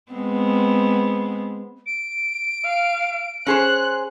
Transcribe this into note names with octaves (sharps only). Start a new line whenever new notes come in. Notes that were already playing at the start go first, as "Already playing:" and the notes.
G#3 B3 C4
D7
F5
C#4 G#4 C5 F#6